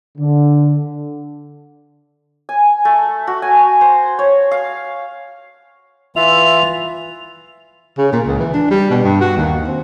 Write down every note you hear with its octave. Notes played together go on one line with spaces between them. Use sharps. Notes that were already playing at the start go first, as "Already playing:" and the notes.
D3
G#5
A3
F#4
G#5
C5
C#5
F5
E3 F4 E5 F7
C#3
A#2
C#2
E3
D4
G3
B2
G2
F#4
D#2
C4